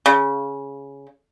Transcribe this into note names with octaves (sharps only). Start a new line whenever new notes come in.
C#3